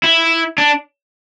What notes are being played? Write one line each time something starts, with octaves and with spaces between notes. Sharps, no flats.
E4
D4